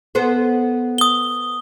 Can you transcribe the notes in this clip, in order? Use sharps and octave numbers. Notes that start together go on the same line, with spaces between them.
B3 A4 C5
D#6 G7